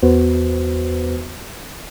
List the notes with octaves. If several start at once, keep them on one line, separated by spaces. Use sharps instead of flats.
E2 B3 F#4 B4 C5